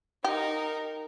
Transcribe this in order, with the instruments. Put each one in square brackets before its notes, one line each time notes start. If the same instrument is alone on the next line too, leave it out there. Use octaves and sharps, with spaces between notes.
[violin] D#4 A#4 [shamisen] G4